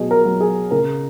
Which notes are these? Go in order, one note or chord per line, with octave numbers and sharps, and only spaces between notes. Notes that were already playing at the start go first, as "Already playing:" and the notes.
Already playing: B2 F#3 F#4 G#4
A#4
F#3
G#4
C#3 A#4